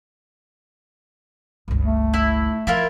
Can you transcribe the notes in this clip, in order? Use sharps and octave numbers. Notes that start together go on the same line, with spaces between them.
G1 C#2
A3
E4
F3 E4 F4 A#4